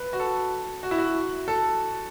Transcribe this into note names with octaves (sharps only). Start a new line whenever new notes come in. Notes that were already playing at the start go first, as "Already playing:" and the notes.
Already playing: B4
F#4
A4
F#4
E4
F#4
A4